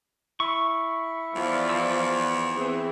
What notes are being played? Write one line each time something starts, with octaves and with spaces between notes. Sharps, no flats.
E4 C#6
E2 F3 F4 D5
E6
E3 C4 G#4